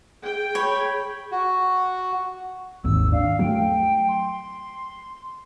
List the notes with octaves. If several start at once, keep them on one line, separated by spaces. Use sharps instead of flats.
G#4 G5
C#5 B5
F#4
G#1 D#2 G#2 E6
D4 F5
F#3 A3 G5
C6